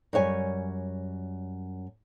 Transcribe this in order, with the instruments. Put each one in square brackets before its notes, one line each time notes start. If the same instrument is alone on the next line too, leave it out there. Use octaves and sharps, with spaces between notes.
[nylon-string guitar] F#2 G3 C#5 G#5